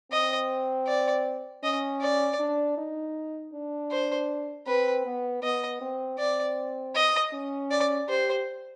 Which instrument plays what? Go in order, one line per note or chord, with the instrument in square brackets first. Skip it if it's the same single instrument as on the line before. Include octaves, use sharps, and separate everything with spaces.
[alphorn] C4 [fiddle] D#5
[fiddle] D5
[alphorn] C#4 [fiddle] D#5
[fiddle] D5
[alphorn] D4
D#4
D4
[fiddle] C5
[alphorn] C4 [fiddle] B4
[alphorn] B3
[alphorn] B3 [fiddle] D#5
[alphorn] C4
[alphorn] C4 [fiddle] D5
[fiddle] D#5
[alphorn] C#4
[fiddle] D5
[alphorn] G4 [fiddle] C5